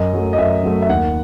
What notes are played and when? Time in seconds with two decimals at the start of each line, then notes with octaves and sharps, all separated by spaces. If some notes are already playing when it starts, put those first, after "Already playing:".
Already playing: F#2 D#5
0.13 F#3 A3
0.33 D#5
0.38 F#2 E5
0.63 F#3 A3
0.82 E5
0.89 D#2 F#5